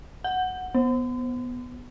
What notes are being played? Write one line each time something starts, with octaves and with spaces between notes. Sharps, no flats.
F#5
B3